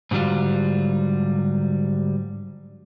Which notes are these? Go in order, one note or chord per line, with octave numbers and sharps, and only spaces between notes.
G#2 D3 F#3 G3 F4